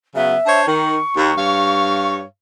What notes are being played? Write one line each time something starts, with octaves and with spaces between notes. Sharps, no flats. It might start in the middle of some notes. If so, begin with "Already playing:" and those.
C#3 F#3 B3 E5
D4 C5 C#5
D#3 C#6
D#2
G2 C#5 F5